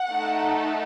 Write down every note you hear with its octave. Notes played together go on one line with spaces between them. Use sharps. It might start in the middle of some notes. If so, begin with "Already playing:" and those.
Already playing: F#5
A3 D#4 A4